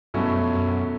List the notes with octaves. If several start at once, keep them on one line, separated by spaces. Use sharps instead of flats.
G2 B2 F#3 A3 C#4 E4
F#2
F2
F#2